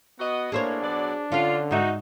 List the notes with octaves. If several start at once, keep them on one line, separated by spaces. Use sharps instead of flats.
B3 F#4 D#5
A2 A#3 D4 G#4 C5 C#5
B2 F#3 D5
D3 C#4 F4 F5
G#2 D#4 F#4 E5